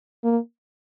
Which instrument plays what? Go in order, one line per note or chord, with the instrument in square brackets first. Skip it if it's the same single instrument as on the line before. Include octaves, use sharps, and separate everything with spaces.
[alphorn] A#3